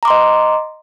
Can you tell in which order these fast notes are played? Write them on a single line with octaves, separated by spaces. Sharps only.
A#5 D6 C6 D#5